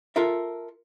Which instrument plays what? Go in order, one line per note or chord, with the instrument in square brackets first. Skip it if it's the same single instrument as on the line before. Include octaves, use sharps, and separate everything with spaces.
[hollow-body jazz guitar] F4 A4 A#4 E5